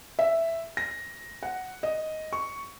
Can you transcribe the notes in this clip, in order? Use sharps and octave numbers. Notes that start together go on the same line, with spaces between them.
E5
A#6
F#5
D#5
C#6